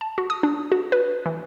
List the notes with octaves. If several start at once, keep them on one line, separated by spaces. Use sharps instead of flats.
A5
F#4
D#6
D4
F#4
B4
E3